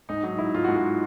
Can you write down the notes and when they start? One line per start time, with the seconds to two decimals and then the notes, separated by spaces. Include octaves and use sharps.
0.09 G#2 D#4
0.23 F#3 D#4
0.38 G#2 E4
0.54 G#2 F4
0.64 G#2 F#4
0.76 F4